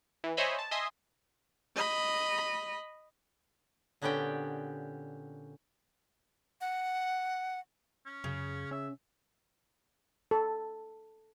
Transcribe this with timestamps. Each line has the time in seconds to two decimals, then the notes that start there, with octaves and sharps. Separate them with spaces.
0.24 E3
0.37 C5 C#5 D#5 E5 G#5 B5
0.59 A5
0.71 D#5 E5 G#5 C6 D#6
1.76 D#5 B5
4.02 A#2 D3 B3 C#4 G4 G5
6.61 F#5
8.06 C#4
8.24 F#2 C#3
8.71 C#4 E5
10.31 A4